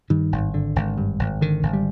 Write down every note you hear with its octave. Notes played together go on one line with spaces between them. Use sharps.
G2 D#3
G#1
D3
G#1
G2
G#1
D3 D#3
G#1
G3